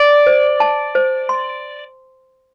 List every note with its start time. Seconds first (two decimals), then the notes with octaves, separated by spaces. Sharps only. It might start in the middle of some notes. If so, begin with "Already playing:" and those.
Already playing: D5
0.27 C5
0.60 A5
0.95 C5
1.29 C6